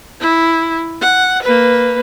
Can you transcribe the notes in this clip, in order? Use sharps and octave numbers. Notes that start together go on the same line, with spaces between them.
E4
F#5
A#3 B4